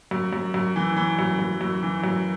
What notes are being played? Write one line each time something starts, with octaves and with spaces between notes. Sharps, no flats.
F#2
F#2
F#2
E3
E3
F#2
F#2
F#2
E3
F#2